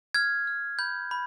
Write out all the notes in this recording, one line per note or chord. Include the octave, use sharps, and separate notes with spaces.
F6 G#6
F6
B5 G6
B5